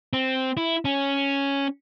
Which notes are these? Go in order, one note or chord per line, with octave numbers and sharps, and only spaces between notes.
C4
E4
C#4